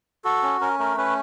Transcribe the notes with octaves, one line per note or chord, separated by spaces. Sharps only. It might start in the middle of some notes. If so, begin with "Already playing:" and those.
F#4 A4
C#4
C#4 A#4
A3 A#4
C#4 B4